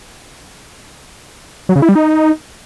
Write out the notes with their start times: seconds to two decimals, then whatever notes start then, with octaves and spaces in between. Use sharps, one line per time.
1.69 F#3
1.76 C#3
1.82 E4
1.89 G3
1.95 D#4